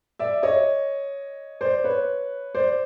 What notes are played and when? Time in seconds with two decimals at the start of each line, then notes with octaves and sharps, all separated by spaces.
0.19 D5 E5
0.43 C#5 D#5
1.61 C5 D5
1.84 B4 C#5
2.55 C5 D5